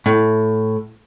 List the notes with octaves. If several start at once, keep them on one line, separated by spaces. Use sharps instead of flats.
A2